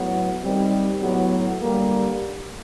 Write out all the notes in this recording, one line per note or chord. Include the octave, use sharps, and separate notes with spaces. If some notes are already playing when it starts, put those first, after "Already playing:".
Already playing: A2 F#3 B3
D#3 G3 C4
A2 F#3 B3
D3 G3 A#3